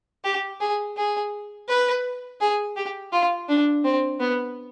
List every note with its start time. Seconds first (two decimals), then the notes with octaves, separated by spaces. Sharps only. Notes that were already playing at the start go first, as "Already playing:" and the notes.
0.25 G4
0.61 G#4
0.97 G#4
1.69 B4
2.41 G#4
2.76 G4
3.12 F4
3.49 D4
3.85 C4
4.21 B3